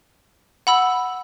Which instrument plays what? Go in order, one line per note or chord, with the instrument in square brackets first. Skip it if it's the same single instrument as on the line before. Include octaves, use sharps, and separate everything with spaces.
[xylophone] F#5 B5 E6